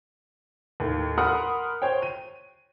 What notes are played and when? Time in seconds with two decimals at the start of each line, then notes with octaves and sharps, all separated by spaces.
0.80 D#2 A2
1.18 A#4 F#5 B5 C6 D#6 F6
1.82 C5 C#5 G5
2.02 D#7